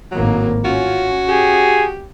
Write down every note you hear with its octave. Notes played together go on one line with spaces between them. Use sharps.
G#1 A2 F#3 A#3
C#4 F4 F#4
G4 G#4